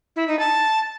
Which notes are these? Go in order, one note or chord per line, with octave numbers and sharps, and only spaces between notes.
E4
D#4
A5